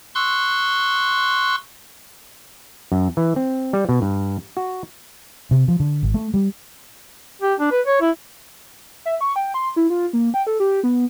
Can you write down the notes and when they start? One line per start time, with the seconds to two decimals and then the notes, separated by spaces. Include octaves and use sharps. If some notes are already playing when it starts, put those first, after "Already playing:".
0.15 C6 C#6 E6 F#6
2.92 F#2
3.17 E3
3.36 C4
3.73 G3
3.89 B2
4.02 G2
4.57 F#4
5.51 C3
5.68 F3
5.80 D3
6.03 G#1
6.14 A3
6.34 G3
7.42 G4
7.60 D4
7.71 B4
7.86 C#5
8.01 E4
9.05 E5
9.21 C#6
9.36 G5
9.54 C6
9.76 E4
9.90 F4
10.13 A#3
10.34 G5
10.47 A4
10.60 G4
10.84 B3